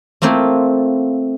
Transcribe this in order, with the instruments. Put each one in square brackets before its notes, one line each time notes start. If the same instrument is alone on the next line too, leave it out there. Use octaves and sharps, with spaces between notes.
[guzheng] A3 A#3 C4 E4 F4